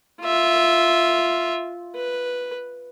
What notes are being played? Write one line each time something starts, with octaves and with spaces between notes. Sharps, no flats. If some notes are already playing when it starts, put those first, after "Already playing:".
F4 E5
B4